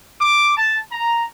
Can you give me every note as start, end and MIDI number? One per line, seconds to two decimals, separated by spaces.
0.19 0.54 86
0.57 0.78 81
0.92 1.23 82